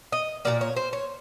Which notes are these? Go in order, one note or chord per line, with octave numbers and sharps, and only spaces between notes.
D#5
A#2 F3 A#3 D5
C#5
C5
C#5